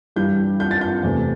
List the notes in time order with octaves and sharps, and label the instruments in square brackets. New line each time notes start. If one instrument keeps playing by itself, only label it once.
[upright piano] G2 E3 G3 G6
G6
A6
G6
E2 C3 A3